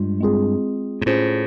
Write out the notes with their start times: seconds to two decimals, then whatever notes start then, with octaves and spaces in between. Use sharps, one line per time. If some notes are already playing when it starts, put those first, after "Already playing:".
Already playing: G2 G#3 F4
0.20 G#3 C4 F4 G#4
1.02 G#2
1.06 A2 C#4 F4 G#4 C5